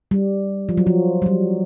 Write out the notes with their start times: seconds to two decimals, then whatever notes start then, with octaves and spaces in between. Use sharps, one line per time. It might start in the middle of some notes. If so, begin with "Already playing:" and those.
0.11 G3
0.69 F3
0.78 F#3
0.87 F3
1.22 G3
1.26 F#3